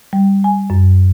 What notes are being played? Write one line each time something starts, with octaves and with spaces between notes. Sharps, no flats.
G3
G#5
F#2